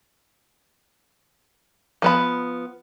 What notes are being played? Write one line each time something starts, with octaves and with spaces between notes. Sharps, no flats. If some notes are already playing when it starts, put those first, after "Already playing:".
F3 B3 B5